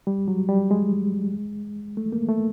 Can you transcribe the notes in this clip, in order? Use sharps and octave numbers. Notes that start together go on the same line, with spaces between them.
G3
F#3
G3
G#3
A3
A#3
A3